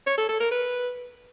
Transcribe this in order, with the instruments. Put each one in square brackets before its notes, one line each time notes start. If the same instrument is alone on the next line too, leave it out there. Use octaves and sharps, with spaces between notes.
[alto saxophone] C#5
A4
A4
A#4
B4